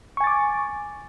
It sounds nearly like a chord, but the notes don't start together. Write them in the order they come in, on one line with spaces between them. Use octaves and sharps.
C#6 G#5 A6 D6